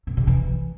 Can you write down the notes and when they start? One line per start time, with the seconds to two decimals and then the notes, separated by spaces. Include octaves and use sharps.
0.07 B2
0.17 C3
0.27 E3